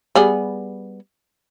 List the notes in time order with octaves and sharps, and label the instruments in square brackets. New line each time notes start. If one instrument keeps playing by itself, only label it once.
[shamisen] G3 B3 G#4